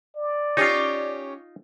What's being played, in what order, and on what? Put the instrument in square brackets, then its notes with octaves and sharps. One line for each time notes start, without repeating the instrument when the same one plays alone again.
[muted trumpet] D5
[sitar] C#4 G4 C#5 [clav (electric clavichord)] D#4 F4